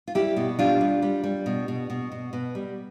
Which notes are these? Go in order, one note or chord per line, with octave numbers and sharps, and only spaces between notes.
F4
G3 E4 G4
B2
G3 D4 F4
G3
G3
G3
B2
B2
B2
B2
B2
G3